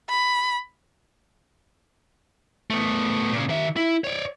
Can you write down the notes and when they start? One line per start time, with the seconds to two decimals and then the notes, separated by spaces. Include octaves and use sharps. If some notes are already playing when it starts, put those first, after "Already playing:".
0.10 B5
2.70 A3 B3
3.32 A#2 C#3
3.49 D#3 E5
3.76 E4
4.04 C#5 D5